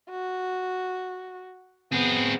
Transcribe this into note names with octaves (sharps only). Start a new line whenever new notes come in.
F#4
B3 C4 G#4